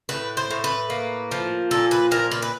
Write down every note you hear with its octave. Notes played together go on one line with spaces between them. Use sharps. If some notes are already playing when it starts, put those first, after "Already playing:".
A2 B4
C5
A2
B4
A#3
F3
A#2 A4
B4
A#2 A#4
B4
B4